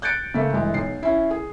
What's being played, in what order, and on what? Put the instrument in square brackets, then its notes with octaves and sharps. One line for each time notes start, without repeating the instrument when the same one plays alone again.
[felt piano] F#6 G6 A6 C#7 D7
C#3 A3 A#3
G1 E3 G#3
B1 C7
C#4 E4
G#4